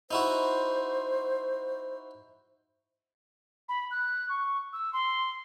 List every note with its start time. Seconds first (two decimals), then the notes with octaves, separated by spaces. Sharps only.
0.11 D#4 E4 F#4 C5
3.69 B5
3.91 F#6
4.29 C#6
4.73 E6
4.93 C6